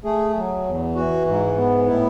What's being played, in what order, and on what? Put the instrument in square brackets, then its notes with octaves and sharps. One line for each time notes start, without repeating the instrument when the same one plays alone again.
[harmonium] A3 G#4
F#3
E2
E3 F#4
G#2
B3
A2 E4